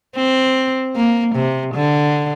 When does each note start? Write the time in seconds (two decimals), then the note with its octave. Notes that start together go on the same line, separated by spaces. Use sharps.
0.15 C4
0.95 A#3
1.35 C3
1.75 D3